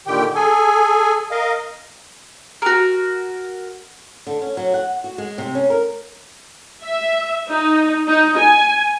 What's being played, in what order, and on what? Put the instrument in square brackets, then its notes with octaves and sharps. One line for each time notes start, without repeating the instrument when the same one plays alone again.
[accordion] A#2 D3 D#3 G4 G5
G#4 A4 G#5
A#4 D#5 F5
[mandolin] F#4 A#4
[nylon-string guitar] D3
C#4
F#3
F#5
F#4
G#3
C3
C#4
A#4
[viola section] E5
D#4
D#4
G#5